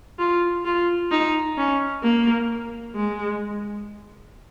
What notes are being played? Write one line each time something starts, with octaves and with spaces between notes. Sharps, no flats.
F4
F4
D#4
C#4
A#3
G#3